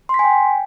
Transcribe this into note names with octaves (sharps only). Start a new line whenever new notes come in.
G5 G#5 C6 B6